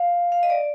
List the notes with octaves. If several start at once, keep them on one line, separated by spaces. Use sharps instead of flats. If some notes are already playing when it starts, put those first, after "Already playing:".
Already playing: F5
F5
D#5
D5